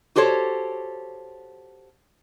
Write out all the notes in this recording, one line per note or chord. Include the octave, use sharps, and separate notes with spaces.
F#4 G4 A4 C5 C#5